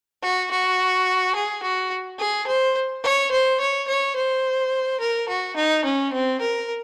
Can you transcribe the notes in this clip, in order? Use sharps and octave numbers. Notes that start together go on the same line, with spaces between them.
F#4
F#4
G#4
F#4
G#4
C5
C#5
C5
C#5
C#5
C5
A#4
F#4
D#4
C#4
C4
A#4